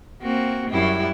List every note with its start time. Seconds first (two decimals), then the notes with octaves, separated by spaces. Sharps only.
0.22 A#3 C4 F#4
0.70 F#2 G3 E4